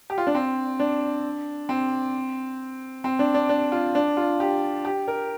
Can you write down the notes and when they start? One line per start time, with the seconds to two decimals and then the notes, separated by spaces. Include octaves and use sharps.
0.10 G4
0.18 F4
0.27 D4
0.35 C4
0.79 D4
1.69 C4
3.04 C4
3.19 D4
3.34 D4
3.49 D4
3.72 F4
3.95 D4
4.17 F4
4.40 G4
4.85 G4
5.08 A#4